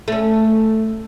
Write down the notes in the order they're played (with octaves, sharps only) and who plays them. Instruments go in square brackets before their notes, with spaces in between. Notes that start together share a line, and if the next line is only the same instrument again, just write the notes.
[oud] A3 C#4